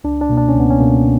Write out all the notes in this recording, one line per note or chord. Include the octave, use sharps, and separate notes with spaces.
C#2 D4
D4
B2 A#3
D4
C#4
C#2 B3
C#4
B2 A#3